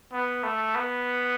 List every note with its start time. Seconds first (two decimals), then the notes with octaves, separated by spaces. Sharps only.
0.12 B3
0.43 A3
0.75 B3